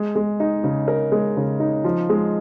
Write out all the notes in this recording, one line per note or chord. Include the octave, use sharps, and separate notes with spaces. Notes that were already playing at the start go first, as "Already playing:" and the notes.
Already playing: G#3
G#3
D#4
C#3
A#4
G#3
C#3
D#4
F3
G#3